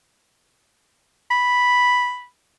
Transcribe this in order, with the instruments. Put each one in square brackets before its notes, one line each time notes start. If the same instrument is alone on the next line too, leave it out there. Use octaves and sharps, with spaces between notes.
[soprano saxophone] B5